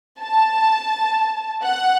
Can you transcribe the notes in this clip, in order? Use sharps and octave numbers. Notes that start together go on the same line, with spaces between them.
A5
F#5